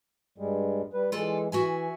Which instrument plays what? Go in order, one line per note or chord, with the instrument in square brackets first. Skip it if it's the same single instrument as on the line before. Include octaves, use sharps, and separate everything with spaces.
[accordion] G2 G3 G#3
G3 B4
[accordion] E3 G#3 [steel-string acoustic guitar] F4 A4 D5
[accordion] E3 [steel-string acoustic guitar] F#4 E5 G#5